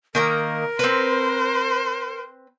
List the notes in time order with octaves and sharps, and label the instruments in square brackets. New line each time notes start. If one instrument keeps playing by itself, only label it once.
[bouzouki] D#3 A#3 A#5 [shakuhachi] A#4
[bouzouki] C4 B4 [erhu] C5